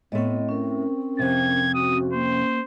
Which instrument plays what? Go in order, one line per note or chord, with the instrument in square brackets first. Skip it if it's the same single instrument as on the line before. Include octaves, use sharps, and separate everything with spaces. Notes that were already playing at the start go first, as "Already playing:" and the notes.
[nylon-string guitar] A2 A3 [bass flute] B3 [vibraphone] C4 D#5
[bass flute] C4 [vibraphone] C#4 A#4
[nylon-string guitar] F2 C3 [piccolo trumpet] G#6
[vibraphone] C#4 F#4 [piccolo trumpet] D#6
[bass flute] A#3 [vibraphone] C#4 [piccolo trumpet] C5